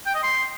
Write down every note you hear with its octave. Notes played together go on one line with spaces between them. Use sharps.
G5
D#5
C6